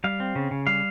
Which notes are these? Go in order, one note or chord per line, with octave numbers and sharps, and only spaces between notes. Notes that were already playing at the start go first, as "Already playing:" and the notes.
G3 F5
C4
C#3
C#3
G3 F5